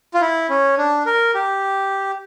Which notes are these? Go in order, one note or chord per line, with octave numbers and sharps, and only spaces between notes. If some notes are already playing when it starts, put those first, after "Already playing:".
F4
E4
C#4
D4
A#4
G4